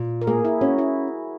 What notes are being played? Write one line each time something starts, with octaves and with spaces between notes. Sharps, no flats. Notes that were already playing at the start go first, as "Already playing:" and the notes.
Already playing: A#2
A#4
A#3 G#4
E4
C#4 F#4
E4